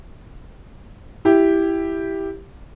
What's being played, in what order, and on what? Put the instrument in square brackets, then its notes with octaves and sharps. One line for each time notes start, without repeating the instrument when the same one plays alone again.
[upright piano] E4 G4